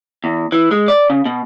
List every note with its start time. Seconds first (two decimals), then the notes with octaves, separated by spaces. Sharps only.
0.24 E2
0.52 E3
0.71 G#3
0.88 D5
1.10 C#3
1.25 B2